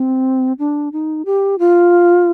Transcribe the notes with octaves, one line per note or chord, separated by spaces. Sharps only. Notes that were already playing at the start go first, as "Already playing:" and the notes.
Already playing: C4
D4
D#4
G4
F4